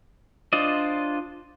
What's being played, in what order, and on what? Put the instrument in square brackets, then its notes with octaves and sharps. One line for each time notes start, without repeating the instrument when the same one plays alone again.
[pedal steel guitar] D4 F4 C5 D5 D#5